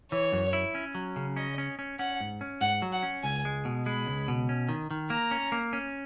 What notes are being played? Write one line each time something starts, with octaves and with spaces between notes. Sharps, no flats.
E3 C#5
F#2
E4
C#4
F#3
C#3
C#4 D#5
C#4
C#4
C#4 F#5
G#2
C#4
G#2 F#5
F#3
F#5
C#4
C#2 G#5
G#3
B2
G#3 B5
C#2
B2
C#4
D#3
D#3
A#3 A#5
C#4
A#3
C#4